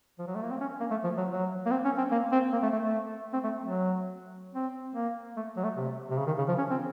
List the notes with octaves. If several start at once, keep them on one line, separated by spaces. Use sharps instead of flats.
F3
F#3
A3
A#3
C4
C#4
A#3
A3
F3
F#3
F#3
A#3
C4
C#4
C4
A#3
C4
A#3
A3
A3
A3
C4
A3
F#3
C4
A#3
A3
F#3
A3
C3
C3
C#3
D#3
C#3
F3
C#4
C4